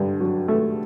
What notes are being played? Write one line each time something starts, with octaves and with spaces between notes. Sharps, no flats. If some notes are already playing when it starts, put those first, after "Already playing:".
Already playing: G2 D3
F#3
A3